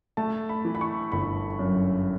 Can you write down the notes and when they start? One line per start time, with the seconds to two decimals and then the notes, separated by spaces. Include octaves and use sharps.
0.17 A3 A5
0.49 B5
0.65 E3
0.75 B5
0.81 C#6
1.12 G1 B5
1.59 F#2